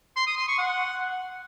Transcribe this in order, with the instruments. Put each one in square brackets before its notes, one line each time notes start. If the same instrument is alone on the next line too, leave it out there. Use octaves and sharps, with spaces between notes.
[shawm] C6
D#6
C6
C#6
F#5